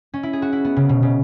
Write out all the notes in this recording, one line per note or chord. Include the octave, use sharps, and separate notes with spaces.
C#4
E4
G#4
F#4
E4
B3
C#3
B2
C#3